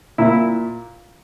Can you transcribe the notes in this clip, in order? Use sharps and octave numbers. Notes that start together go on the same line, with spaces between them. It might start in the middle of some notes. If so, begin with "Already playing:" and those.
A#2 E4